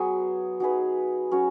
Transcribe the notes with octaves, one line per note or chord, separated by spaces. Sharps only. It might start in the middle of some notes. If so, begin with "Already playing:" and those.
Already playing: F#3 B3 G#4
F#3 D#4 G#4 B4
F#3 C#4 F#4 C#5